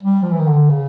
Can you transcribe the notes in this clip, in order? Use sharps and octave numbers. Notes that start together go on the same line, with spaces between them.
G3
F3
E3
D#3
D3
C#3